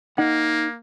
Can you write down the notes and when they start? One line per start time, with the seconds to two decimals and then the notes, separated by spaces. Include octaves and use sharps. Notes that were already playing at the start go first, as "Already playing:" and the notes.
0.18 A#3 D#4 F#5